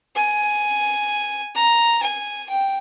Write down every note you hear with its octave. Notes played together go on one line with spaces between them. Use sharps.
G#5
A#5
G#5
G5